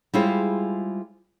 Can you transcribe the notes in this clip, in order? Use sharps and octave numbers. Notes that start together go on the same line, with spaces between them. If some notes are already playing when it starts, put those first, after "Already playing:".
G3 G#3 E4 F4 G#4 C5